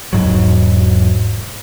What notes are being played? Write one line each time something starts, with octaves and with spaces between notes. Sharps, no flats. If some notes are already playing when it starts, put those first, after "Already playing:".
E1 G#2 F#3